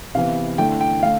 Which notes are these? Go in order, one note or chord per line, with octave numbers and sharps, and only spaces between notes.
C3 E3 B3 F5
D3 A3 E4 G5
G5
D3 A3 F5